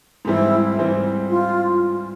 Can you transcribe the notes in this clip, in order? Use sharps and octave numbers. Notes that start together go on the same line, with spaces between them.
G#2 E3 G3 C4 E4
G#2 E3 G3 C4
F4